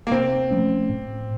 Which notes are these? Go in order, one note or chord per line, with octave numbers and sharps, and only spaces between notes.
A#3
C3 C4
F3 A3 C#4
A2